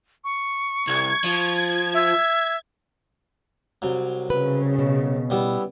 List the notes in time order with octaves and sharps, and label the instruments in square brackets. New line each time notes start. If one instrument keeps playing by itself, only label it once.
[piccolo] C#6
[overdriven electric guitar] C2 [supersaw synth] G#6
[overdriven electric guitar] F3
[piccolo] E5
[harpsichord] C2 F#3
[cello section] C#3 [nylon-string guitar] B4
[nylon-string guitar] B2
[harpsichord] G3 B3 E4